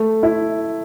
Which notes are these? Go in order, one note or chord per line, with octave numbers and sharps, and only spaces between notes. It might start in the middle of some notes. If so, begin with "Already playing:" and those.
Already playing: A3
E4